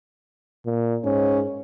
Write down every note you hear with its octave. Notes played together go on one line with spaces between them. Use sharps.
A#2
G#2 C#4